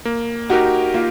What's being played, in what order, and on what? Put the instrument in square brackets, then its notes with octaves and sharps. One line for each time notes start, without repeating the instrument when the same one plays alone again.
[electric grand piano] A#3
[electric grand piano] D#4 G4 A#4 [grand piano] F#4
[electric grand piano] A#3 [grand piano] F4